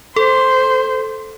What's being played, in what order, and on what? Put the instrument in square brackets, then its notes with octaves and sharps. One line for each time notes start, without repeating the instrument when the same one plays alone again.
[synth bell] A4 [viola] C5